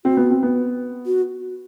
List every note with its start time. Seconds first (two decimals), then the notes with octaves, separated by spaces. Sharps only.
0.05 C4 F#4
0.17 B3
0.30 C4
0.43 B3
1.06 F#4